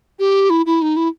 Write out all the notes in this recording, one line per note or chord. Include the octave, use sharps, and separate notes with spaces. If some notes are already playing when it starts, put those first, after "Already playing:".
G4
E4
E4
D#4
E4